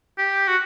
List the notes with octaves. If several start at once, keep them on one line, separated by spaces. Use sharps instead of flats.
G4
F#4